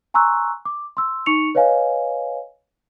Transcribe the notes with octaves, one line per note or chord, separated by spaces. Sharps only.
G#5 A#5 C6 C#6 E6 F#6
D6
C6 E6
D#4 C#6 C#7 F7
B4 C#5 D#5 F5 G#5